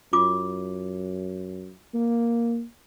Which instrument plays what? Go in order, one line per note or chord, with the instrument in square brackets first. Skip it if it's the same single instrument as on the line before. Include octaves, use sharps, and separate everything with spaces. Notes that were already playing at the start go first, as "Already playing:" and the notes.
[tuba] F#2 [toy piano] F4 D6
[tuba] A#3